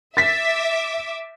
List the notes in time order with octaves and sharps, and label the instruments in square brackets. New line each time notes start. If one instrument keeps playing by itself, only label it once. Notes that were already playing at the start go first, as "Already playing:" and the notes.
[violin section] E5 D6 [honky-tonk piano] A6 B6